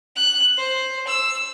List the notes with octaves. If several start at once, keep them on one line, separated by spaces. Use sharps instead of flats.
F#6
C5
E6